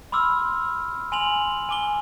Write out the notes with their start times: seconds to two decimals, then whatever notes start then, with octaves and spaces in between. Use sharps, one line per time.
0.12 B5 C6 D6 E6 F6
1.12 G#5 C6 F7 F#7
1.69 G#5 D6 G7